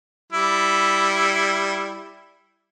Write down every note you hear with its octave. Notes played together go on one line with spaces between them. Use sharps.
G3 E4